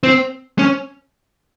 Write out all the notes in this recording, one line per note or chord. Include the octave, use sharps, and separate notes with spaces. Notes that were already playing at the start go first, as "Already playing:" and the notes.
C4
C#4